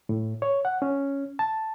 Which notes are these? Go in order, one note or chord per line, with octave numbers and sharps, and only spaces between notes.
A2
C#5
F#5
C#4
A5